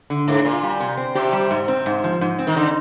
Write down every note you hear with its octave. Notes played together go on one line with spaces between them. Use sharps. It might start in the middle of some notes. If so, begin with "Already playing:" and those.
D3
G#2 A#3
A#2 F4
G3
C3
C4
C3 G4
G3
G#2
C4
G#2
F3
G#2
C4
D#3
D3 D#4